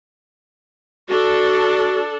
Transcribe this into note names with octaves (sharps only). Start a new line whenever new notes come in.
D4 F#4 A4